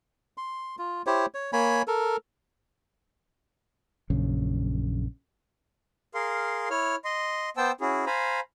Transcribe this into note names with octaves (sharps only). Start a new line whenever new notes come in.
C6
F4
E4 G4 C5 C#5
C#5
A#3 C#5 G#5 B5
A4 A#4
A#1 F#2 C#3
G#4 A#4 F5 C6
E4 C#5 F6
D#5 C6
B3 C5 G5 A5 E6
C#4 E4 F#4 G#4
C5 F5 G#5 A#5 B5